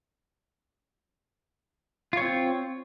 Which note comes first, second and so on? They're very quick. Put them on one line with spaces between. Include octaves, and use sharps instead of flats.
F4 C#5 C4